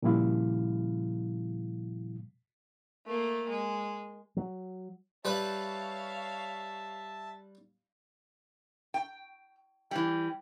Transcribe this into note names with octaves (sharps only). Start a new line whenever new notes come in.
A#2 C#3 F3 G3 E4 F5
A3 A#3
G#3
F#3
G3 B4 C#5 E5 F5 A5
G5
E3 G3 G5